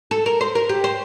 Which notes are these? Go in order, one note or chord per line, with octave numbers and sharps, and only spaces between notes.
A4
A#4
C5
A#4
G4
C5